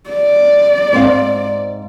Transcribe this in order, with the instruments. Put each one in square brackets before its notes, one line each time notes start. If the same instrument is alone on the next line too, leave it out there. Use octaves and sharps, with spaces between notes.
[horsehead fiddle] D5
[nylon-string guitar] G#2 C4 F5